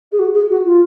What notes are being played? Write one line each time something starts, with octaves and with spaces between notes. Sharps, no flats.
G#4
F#4
G#4
F#4
F4